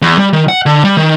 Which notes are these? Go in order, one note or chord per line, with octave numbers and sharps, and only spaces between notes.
E2
G3
D#3
F#5
D3
G3
D#3